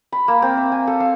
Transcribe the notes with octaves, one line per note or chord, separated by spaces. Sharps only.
B5
A#3
C4
E5
G#5
A4
F5